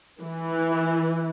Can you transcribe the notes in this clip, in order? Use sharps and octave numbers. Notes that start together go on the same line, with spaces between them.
E3